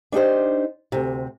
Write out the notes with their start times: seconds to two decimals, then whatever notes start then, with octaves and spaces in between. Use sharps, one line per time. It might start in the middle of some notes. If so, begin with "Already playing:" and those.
0.12 D4 D#4 G4 C5
0.92 D2 C3